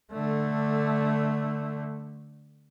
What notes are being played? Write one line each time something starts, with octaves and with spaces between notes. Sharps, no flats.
D3 A3